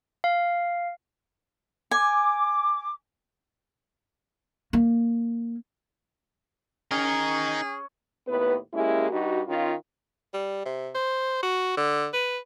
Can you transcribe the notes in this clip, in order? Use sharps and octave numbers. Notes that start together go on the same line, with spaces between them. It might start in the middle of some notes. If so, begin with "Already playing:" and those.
F5
G#5 D6
A#3
C#4 D#4 G#4 A#4
D#2 A2 B3 B4
G#3 A#3 C#4 E4 G4
G2 D#4 F#4
D#3 C#4 F4
G3
C3
C5
F#4
D3
B4